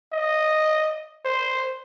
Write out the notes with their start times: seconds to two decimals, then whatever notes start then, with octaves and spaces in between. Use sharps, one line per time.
0.13 D#5
1.25 C5